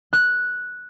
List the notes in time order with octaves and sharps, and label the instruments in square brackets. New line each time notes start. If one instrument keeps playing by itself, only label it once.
[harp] F#6